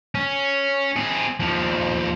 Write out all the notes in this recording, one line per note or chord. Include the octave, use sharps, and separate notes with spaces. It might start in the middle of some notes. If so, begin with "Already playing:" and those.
C#4
C4 G#4
D#2 F3